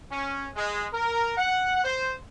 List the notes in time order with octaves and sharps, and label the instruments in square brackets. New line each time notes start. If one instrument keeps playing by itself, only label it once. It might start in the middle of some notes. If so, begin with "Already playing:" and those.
[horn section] C#4
G#3
A#4
F#5
C5